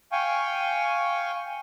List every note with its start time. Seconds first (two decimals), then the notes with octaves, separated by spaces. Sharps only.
0.12 F5 G5 G#5 C#6